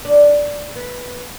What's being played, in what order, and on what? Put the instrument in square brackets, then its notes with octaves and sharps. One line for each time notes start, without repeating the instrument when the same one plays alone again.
[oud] D4
B3